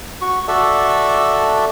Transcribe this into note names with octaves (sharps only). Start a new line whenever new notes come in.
F#4 C#6
F#4 A4 D5 E5